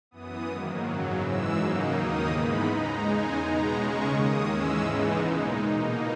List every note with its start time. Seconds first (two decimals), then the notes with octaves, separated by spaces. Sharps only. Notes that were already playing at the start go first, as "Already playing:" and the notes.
0.11 F#2 E3 B3 D#6
0.47 G#2 D#3 F#3 A#3
0.84 F#2 C#3 F#3
1.20 G#2 E3 G#3 E6
1.56 C#3 F#3 A#3 D#4
1.92 D#2 D#3 A#3 D#4 D#6
2.29 G#2 E3 G#3 B3 D#4 B5
2.64 C#3 G#3 D#4 A#5
3.01 E2 C#3 G#3 D#4 G#5
3.37 B2 G#3 B3 D#4 A#5
3.73 C#3 G#3 C#4 C#6
4.10 D#2 D#3 A#3 D#6
4.46 G#2 E3 G#3 C#4 E6
4.83 C#3 E3 G#3 B3 D#4
5.19 A#2 G#3 D#4
5.55 B2 A#3 D#4